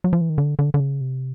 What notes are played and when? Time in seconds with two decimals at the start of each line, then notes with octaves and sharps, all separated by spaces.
0.04 F#3
0.13 F3
0.21 E3
0.30 D#3
0.38 D3
0.59 D3
0.74 D3
0.80 C#3
1.01 C3